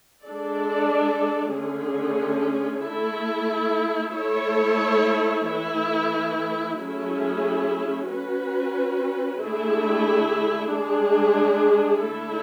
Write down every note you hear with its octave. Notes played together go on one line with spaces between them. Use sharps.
G#3 D4 A4 D5
D3 A3 C#4 G#4
A3 E4 A4
A3 E4 A4 C#5
E3 A3 E4
F#3 A3 C#4 E4 G#4
C#4 F#4 B4
D3 A3 E4 G#4
G#3 D4 G#4
D3 A3 E4 A4